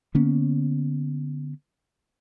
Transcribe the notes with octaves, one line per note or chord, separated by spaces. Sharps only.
D3 A#3 B3 C#4